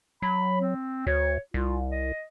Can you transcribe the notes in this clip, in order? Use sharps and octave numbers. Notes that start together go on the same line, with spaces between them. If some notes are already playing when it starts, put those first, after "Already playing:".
F#3 B5
C4
D2 C#5
C2 F4
D#5